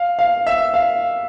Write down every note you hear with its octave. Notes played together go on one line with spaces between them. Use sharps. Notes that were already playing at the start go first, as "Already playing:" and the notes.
Already playing: F5
F5
E5
F5